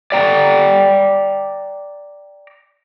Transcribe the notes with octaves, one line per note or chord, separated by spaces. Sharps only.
D5 G5 A#5